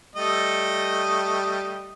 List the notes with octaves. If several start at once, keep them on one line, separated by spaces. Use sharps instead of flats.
G3 A3 D#5